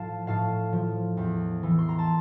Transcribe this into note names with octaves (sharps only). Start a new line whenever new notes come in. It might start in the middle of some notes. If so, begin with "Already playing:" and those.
Already playing: A2 F3 F5 A5
A2 F5 A5
F3
E2
E3
C6
A#5
A5